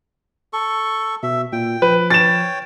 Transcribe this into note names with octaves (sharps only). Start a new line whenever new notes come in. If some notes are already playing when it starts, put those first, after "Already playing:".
A4 C#6
B2 E5
A#2 G5
F3 B4
C#5 G5 A6 E7